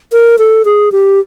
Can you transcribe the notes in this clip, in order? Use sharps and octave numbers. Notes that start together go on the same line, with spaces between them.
A#4
A4
G#4
G4